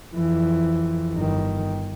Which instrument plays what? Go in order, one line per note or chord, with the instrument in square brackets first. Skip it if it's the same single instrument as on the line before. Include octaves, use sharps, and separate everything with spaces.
[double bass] F2 E3
G1 D#3